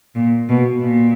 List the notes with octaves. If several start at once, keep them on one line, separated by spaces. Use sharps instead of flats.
A#2
B2
A#2